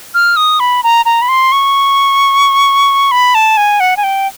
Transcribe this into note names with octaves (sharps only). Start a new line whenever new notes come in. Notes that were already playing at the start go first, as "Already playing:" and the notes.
F6
D#6
B5
A#5
A#5
B5
C6
C#6
B5
A5
G#5
F#5
G#5
G5